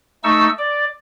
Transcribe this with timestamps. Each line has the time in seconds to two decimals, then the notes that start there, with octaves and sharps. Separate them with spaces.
0.24 A3 D#4 C#6 E6
0.58 D5